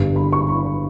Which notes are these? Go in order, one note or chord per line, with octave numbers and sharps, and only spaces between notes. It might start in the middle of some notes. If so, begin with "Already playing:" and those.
Already playing: G1 G2 G3
B5
C#6
B5